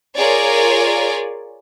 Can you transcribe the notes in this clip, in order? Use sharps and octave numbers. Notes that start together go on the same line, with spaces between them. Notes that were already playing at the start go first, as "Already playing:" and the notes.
F4 G#4 A#4 C#5 D5